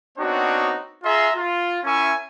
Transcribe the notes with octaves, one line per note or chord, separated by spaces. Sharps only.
B3 C4 D4 D#4 F#4 C#5
F4 G#4 E5 A#5 C6
F4
C#4 E4 A#4 E5 G#5 C#6